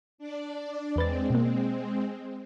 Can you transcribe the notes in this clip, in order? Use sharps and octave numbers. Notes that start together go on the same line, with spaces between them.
D4 D5
E2 G#3 C4 B4 A6
B2 A#3